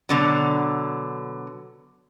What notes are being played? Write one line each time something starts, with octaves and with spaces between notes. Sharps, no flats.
B2 D3 F#3